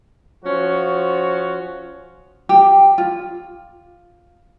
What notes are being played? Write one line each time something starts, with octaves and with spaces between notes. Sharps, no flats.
F3 C#4 F#4
G4
F4